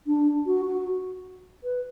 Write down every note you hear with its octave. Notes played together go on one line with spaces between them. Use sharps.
D4
F#4
F#4
B4